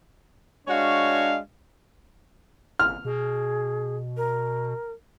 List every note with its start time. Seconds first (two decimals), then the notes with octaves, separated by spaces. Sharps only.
0.68 G#3 D4 F#4 C#5 F5
2.79 G1 F6
3.05 B2 G#4
4.17 A#4